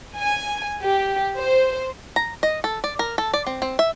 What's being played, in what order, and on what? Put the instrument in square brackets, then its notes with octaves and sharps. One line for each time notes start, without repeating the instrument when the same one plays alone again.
[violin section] G#5
G4
C5
[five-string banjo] A#5
D#5
A4
D5
A#4
A4
D5
C4
C4
E5